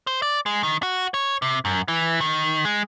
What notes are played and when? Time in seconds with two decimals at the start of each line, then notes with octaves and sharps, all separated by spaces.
0.07 C5
0.22 D5
0.46 G#3
0.63 D#3
0.83 F#4
1.14 C#5
1.42 C3
1.65 F#2
1.88 E3
2.20 D#3
2.65 G#3